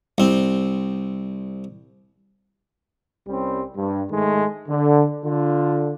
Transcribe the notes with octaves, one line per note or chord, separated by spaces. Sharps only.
C2 C4
C2 G3 C4 C#4
G2
G#2 D#3 G#3 A3
D3
D3 F4